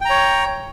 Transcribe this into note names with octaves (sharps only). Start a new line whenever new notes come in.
C#5 G5 A#5